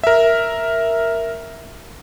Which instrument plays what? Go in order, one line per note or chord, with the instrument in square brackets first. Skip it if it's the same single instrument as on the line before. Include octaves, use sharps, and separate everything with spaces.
[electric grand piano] A#4 E5